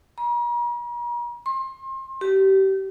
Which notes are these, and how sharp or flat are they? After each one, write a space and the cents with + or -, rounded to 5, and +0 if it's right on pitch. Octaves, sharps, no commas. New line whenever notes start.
A#5 +45
C6 +35
G4 -30